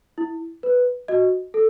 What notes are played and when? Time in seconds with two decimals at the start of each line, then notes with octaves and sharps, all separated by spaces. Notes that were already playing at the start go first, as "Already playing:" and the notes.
0.18 E4
0.63 B4
1.08 F#4 D#5
1.54 A4